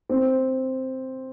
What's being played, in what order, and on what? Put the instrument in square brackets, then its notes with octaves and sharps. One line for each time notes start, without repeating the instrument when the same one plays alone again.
[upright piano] C4